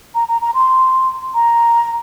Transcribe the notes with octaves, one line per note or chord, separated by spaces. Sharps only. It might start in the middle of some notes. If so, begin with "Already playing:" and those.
A#5
A#5
A#5
C6
A#5